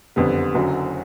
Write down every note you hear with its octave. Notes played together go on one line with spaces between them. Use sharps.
F#1 F2 D3 G3 B3
F#1 F#2 D3 F#3